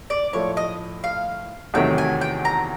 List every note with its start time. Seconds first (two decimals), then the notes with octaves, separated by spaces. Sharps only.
0.10 D5
0.33 A2 F3 A3 C#5
0.57 D#5
1.04 F5
1.74 E2 C3 D#3 F#3 A3 G5
1.98 G#5
2.21 G5
2.45 A#5